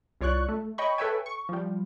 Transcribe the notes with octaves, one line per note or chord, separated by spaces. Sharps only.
C2 F4 C#5 D5 C#6 F#6
A3
C#5 D#5 G5 B5 C#6
A4 B4 C#5 E5 G5 G#5
C#6
F3 G3